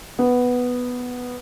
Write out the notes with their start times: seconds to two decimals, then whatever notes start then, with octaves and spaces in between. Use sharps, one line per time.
0.19 B3